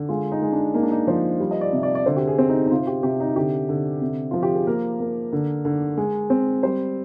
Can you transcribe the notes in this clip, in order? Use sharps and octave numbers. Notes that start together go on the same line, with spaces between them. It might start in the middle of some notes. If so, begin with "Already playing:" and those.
Already playing: D3
G#3 F4
D#4
G#3
D4
A#3 D#4
D4
D#4
F3 C5
G3
D#5
D5
C3
D5
D5
D3 C5
G4
G#4
C4
D#4
D#4
C3 F4
G4
C3 G4
D#4
D3 G4
D3
C3
F3 F4
G4
G#4
A#3 A#4
A#3
D3
D3
G#3
C4
G3 C5